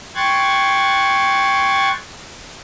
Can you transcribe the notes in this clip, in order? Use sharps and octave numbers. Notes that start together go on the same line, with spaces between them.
G5 C6 C#6 F#6 G#6 A6